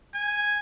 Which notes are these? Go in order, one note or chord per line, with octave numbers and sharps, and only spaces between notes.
G#5